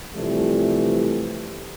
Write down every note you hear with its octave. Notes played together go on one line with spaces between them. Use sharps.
C3 E3 F3 G3 A3